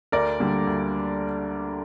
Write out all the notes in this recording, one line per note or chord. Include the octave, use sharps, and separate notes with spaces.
D2 A#4 D5
D3 G3 A#3
D2